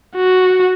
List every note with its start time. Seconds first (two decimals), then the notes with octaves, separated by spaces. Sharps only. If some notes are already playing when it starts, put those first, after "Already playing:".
0.16 F#4